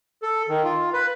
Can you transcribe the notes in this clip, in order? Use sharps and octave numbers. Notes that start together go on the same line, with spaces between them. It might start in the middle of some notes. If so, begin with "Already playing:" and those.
A4
D#3
F4
B4